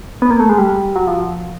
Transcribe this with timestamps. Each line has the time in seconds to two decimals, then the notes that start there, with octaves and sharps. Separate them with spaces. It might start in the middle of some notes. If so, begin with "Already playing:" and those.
0.22 B3
0.31 A#3
0.40 A3
0.49 G#3
0.58 G3
0.96 F#3
1.07 F3